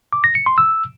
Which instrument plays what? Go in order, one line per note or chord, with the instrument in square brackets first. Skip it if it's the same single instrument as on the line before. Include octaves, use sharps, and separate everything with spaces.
[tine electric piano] D6
A#6
C#7
C6
E6